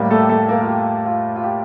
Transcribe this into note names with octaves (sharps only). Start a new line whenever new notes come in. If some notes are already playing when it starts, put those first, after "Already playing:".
Already playing: A2 G3 A#3
A3 A4
G4
A3 A4
A#3 A#4
F4
G4
F4
F4
G4